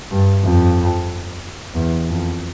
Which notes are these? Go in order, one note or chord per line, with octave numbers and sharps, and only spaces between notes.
G2
F2
E2
F2